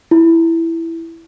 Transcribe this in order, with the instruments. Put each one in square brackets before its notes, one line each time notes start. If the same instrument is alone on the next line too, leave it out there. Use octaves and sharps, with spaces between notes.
[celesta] E4